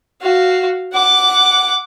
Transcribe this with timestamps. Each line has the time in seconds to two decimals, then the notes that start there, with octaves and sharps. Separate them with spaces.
0.21 F#4 F5
0.93 F#5 D6